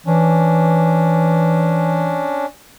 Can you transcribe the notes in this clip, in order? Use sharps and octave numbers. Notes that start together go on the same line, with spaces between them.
E3 C#4 D4